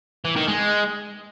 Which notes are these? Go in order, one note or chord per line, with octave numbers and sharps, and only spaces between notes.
E3
D#3
G#3